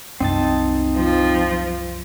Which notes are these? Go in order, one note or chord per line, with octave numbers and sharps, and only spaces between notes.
C2 F#2 C4 D#4 A5
F3